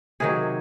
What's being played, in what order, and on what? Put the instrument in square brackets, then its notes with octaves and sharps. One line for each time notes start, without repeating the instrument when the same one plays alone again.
[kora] C3 D#3 F#3 G#4